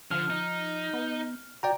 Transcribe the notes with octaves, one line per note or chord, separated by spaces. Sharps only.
D3 F3 F6
D#4
B3
F#4 D5 G5 A#5